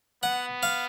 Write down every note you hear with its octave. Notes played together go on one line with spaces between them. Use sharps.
B3 F#5
F5